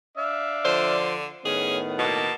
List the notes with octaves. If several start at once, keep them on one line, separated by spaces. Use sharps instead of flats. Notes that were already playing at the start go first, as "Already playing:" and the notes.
D4 E5 F5
D3 F3 C5 D5
A2 D#3 B3 C#4 G#4
B2 A#3 F#4 A5